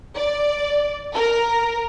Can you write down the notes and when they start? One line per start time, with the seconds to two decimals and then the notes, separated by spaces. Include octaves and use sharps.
0.16 D5
1.14 A#4